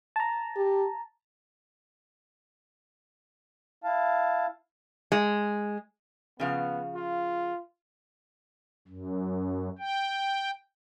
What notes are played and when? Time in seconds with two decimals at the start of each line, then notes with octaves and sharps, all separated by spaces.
0.16 A5 A#5
0.56 G4
3.84 E4 F5 A5
5.12 G#3
6.40 C#3 F3 B3 F5
6.95 F4
8.88 F#2
9.79 G5